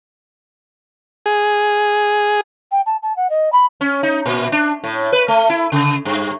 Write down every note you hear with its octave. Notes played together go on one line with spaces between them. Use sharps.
G#4
G5
A5
A5
F#5
D#5
B5
C#4
D#4
A#2
D4
A2
B4
A3
E4
C#3
G2